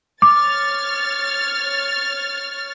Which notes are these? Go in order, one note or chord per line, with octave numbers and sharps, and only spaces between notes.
C#5 D6 F6 A6